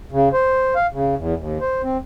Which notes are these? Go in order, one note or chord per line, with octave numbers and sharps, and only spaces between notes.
C#3
C5
F5
C#3
E2
D#2
C5
C4